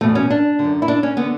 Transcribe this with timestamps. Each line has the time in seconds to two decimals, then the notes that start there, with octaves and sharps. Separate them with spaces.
0.01 E2 B2 A3
0.15 C#4
0.30 D4
0.59 D3
0.64 F#2
0.82 E4
0.88 D4
1.03 C#4
1.17 D3 B3